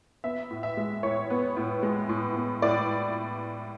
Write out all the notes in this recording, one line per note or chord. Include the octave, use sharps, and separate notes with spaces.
B3 E5
A2
E5
G#3
A2 C#5
B3
A2
G#3
A2
B3
A2 D5